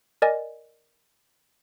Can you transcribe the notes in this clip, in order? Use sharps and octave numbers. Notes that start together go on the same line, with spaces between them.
A#4 D5 D#5 G#5